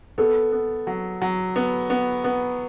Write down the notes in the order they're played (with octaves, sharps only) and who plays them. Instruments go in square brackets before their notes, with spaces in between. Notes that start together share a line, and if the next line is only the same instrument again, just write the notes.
[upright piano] B3 [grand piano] A4
[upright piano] B3
F#3
F#3
B3
B3
B3